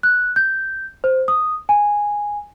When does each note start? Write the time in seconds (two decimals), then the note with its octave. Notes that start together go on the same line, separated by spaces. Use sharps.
0.03 F#6
0.36 G6
1.04 C5
1.28 D#6
1.69 G#5